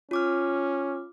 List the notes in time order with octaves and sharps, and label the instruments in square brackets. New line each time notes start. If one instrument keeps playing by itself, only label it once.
[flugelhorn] C#4 [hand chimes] F4 D6 F6